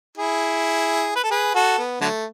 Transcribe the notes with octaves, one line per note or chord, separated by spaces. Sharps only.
E4 G#4
B4
A4
G#4 B4
F#4 A4
B3
D3 F#3 A3